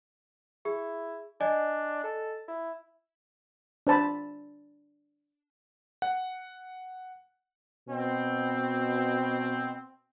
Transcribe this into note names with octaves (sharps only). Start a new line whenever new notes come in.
E4 G#4
D4 D5 D#5 G#5
A4
E4
D4 C5 A5 B5
F#5
B2 C4